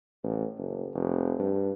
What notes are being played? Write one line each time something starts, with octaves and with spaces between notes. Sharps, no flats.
A1
F#1
F1
G2